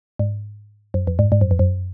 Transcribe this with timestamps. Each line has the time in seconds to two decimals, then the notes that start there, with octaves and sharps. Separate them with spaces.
0.19 G#2
0.94 F#2
1.07 F2
1.19 G#2
1.32 G#2
1.41 F#2
1.51 F2
1.59 F#2